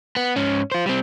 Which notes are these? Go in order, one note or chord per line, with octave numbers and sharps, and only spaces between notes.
B3
G#2 C#4
F4 C5
G3 C4